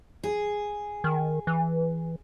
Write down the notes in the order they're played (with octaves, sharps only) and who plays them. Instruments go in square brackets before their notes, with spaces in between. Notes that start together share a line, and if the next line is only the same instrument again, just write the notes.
[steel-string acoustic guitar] G#4
[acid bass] D#3
E3